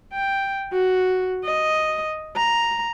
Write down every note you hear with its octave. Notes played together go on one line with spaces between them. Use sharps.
G5
F#4
D#5
A#5